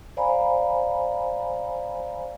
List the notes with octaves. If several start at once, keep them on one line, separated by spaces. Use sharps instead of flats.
C5 D5 F5 G#5 A#5 B5